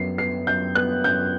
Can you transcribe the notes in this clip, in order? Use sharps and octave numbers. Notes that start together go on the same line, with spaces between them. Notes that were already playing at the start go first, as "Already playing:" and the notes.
Already playing: F#2 B3 C7
B3 C7
F#2 G6
B3 F#6
F#2 G6